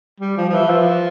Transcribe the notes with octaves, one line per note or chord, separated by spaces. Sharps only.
G3
F3
F3
E3
F3